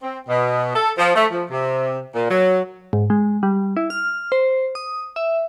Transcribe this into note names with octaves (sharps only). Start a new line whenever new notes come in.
C4
B2
A4
F3
A3
F3
C3
A#2
F#3
G#2
G#3
G3
E4
F6
C5
D#6
E5